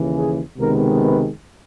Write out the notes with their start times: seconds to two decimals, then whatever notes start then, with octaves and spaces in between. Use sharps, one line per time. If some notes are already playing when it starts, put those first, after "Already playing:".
Already playing: D#2 C#3 E3
0.14 G#4
0.57 C#2 C3 D#3 G#3 B3 A#4
1.03 B4